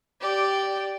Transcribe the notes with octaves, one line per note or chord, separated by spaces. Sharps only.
G4 D5